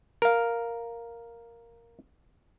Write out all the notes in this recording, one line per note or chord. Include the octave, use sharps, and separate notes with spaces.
A#4 F5